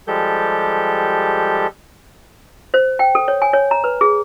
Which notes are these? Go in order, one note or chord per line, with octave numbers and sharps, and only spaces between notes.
F3 G3 G#3 G4 A4 G6
C5
G5
A4
C#5
G#5
C#5
A#5
B4
G#4